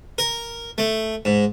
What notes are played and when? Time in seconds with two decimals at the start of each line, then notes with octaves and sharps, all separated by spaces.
0.18 A#4
0.78 A3
1.25 G#2